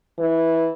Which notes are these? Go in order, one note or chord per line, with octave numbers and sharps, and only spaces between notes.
E3